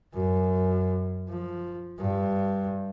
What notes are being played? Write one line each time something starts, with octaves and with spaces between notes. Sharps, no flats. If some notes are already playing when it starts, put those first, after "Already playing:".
F#2
F3
G2